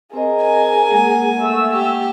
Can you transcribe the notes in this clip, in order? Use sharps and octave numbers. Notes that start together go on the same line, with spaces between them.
C4 G#4 A#4 C5 D#5
G#5
G#3 A#3 F#5
A3 E6
G4